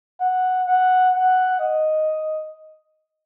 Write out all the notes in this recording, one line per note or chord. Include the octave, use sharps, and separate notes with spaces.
F#5
F#5
F#5
D#5